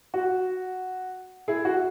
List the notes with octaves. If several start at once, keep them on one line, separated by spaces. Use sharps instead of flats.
F#4
E4 G#4
F#4